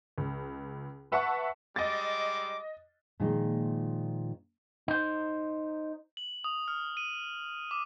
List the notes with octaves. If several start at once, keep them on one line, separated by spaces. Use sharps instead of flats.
C#2
B4 E5 F#5 A5 C#6
G3 G#3 D#5 D6 A6
A#2 D#3 F3 G#3 A#3 D#4
D#4 C5
F#7
D#6
F6
D#7
D6